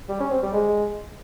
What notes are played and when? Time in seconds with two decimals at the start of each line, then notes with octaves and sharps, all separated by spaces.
0.09 G3
0.20 C#4
0.31 C4
0.43 G3
0.54 G#3